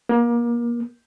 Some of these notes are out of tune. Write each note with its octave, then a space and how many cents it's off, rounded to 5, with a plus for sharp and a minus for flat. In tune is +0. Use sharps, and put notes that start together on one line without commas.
A#3 +30